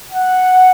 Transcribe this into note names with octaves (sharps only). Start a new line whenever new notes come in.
F#5